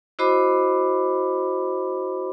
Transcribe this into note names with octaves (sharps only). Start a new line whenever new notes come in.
E4 F#4 C5 D#5 B5 D6